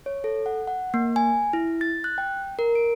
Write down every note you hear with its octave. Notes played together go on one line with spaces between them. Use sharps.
C#5
A4
F#5
F#5
A#3
G#5
E4
A6
F#6
G5
A#4
D7